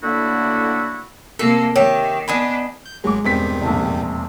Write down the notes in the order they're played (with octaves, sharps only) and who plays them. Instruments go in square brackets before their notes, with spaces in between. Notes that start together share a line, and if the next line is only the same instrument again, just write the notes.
[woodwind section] A2 D3 A#3 D4 E4 F#4
[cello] C3 A#3 [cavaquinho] A4
[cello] D#3 [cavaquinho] G4 E5 [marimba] C#5
[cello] B3 D4 [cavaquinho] D#5 G#5 B5
[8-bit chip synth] G6
[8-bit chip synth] G#1 F#3 [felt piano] G#3 D6
[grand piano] E1 C4 B6 [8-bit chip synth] G2 D#3 G3
[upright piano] F1 A#1